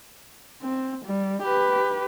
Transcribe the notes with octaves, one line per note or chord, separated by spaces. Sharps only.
C4
G3
G4 B4